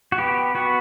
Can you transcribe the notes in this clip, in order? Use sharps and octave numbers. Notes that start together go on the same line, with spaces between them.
F#4
B3 G4
B3 F#4